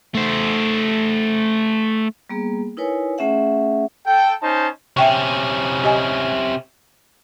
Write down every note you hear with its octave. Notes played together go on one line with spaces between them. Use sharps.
A3 C5
G3 A#3 B3 G#4
D#4 E4 A#4 B4 C#5 G#5
A3 C#4 G#4 E5 F#5
A4 G5
C#4 D#4 C5 A5
C3 C#4 E5 G5 C#6
G4 D#5 G#5